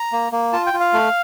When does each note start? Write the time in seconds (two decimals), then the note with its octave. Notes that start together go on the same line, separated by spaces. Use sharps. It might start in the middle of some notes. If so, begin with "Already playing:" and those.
Already playing: A#5
0.12 A#3
0.32 A#3
0.53 F4 A5
0.67 G5
0.73 F4
0.80 F5
0.93 A3